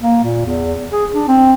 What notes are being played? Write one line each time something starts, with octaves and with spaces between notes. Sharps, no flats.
A#3
A#2
E2
G#4
D4
C4